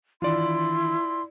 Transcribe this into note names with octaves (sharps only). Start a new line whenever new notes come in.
D#3 E3 D4 E4 F4 D5 C6